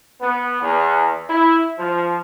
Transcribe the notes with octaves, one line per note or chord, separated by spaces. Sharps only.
B3
E2
E4
F3